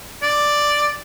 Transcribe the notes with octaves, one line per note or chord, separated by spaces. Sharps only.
D5